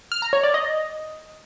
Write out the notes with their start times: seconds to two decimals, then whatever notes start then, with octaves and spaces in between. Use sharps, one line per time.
0.12 F6
0.22 A#5
0.33 C#5
0.43 D5
0.54 D#5